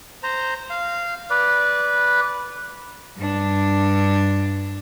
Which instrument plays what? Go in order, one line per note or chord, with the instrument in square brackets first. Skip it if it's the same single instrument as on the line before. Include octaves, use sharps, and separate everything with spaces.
[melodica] C5 A#5
F5
B4 D5
[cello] G2 D4